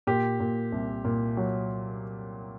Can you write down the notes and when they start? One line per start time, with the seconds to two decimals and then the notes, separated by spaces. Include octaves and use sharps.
0.07 A#2 G4
0.40 A#2
0.72 C2
1.05 A#2
1.37 F#3